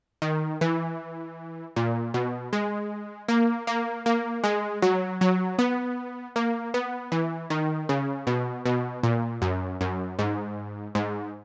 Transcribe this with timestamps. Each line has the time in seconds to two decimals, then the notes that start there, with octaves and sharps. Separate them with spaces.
0.22 D#3
0.61 E3
1.76 A#2
2.14 B2
2.53 G#3
3.28 A#3
3.67 A#3
4.06 A#3
4.44 G#3
4.82 F#3
5.21 F#3
5.59 B3
6.36 A#3
6.74 B3
7.12 E3
7.50 D#3
7.89 C#3
8.27 B2
8.66 B2
9.03 A#2
9.42 F#2
9.81 F#2
10.19 G#2
10.95 G#2